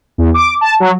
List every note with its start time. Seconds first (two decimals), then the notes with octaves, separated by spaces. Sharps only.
0.18 E2
0.34 D6
0.61 A5
0.80 F#3